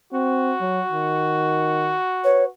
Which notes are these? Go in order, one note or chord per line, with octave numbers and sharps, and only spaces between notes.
C4 F#4
F#3
D#3
B4 C#5